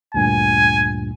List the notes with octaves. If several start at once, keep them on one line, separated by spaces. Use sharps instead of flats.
D2 G2 A#2 G#5